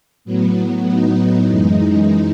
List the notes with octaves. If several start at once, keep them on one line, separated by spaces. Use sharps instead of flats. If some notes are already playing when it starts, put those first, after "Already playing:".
A2 F#3 B3
A2 F#3 B3 D#4
F#2 E3 G#3 D#4